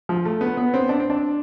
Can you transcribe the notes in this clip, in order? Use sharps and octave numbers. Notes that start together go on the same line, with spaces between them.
F3
A3
B3
B3
C4
D4
C4
D4